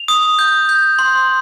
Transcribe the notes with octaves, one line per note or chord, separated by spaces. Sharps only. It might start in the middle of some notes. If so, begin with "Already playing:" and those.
Already playing: F7
D#6
G6
G6
C6